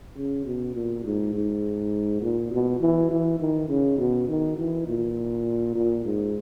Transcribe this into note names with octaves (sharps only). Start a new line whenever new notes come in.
C#3
B2
A#2
G#2
G#2
A#2
B2
E3
E3
D#3
C#3
B2
D#3
E3
A#2
A#2
G#2